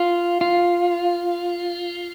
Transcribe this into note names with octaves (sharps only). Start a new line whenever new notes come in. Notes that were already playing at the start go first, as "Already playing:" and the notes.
Already playing: F4
F4